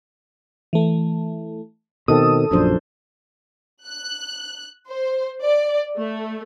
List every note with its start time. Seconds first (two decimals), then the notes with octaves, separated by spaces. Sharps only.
0.73 E3 A3
2.08 B2 D#3 C4 A4 D#6
2.51 A#1 F#2 F3 D4 C5
3.86 F#6
4.87 C5
5.43 D5
5.97 A3